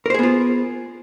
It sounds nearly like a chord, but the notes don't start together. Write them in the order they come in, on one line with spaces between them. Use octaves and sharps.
A#4 C5 G#4 B3 F4